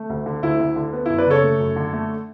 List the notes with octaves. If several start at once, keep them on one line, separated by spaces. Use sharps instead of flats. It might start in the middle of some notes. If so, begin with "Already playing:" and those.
Already playing: A3
D2
D3
D2 E4
D2
D3
B3
E4
F#2
B4 D5
C#3 A4 C#5
A3
F#2
D3
A3